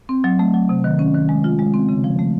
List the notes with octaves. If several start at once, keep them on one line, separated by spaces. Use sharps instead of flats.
C4
F#3
A3
F#3
C3
D#3
C#4
D#3
G#3
F4
G#3
C4
C#3
F3
A3